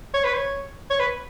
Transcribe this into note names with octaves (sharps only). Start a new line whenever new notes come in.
C#5
B4
C#5
C#5
B4